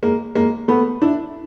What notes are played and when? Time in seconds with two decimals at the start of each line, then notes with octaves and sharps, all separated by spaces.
0.03 G#3 A#3
0.35 G#3 A#3
0.68 A3 B3
1.02 D4 E4